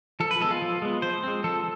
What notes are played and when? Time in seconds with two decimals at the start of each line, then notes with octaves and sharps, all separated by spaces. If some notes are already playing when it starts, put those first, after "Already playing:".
0.20 F3 A4
0.31 B4
0.41 G#3 B3 A4
0.51 F4
0.62 F3
0.82 G#3 B3
1.02 F3 C5
1.23 G#3 C4
1.44 F3 A4